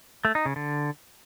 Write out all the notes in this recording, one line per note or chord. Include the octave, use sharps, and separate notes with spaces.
A3
D#4
C#3
D3